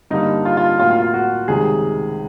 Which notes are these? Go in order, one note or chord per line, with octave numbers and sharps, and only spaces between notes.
G2 D3 G3 A#3 D#4
F4
F4
A2 F#3 A#3 F4
F4
F4
F#4
C#2 C3 D#3 G3 G#4